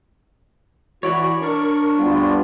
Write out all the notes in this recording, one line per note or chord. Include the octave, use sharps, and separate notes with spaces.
E3 F#4 C#5 D5 B5
D4 A#4 C#6
D2 G2 G3 B3 F4